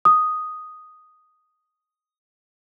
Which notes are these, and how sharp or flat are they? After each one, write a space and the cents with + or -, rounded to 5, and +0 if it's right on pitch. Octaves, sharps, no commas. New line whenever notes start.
D#6 +0